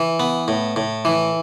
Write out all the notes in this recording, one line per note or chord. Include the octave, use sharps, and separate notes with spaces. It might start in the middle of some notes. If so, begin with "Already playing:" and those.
Already playing: E3
B3
A2
A2
E3